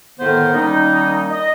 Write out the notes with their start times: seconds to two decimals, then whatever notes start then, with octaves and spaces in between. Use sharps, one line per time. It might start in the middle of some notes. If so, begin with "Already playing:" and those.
0.19 A2 D3 D#3 B3 A#4 C5
0.52 D#3 G3 A#3 C#4 D#4
1.31 D#5